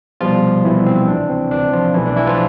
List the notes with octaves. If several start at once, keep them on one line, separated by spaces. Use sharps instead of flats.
C2 B2 F3 G3 B3 F4
C2 B2 E3 G3 B3 E4
C4
D2 C3 E3 D4
C4
D2 C3 E3 D4
F3 F4
B1 B2 E3 A3 E4
D4
E3 E4
F3 F4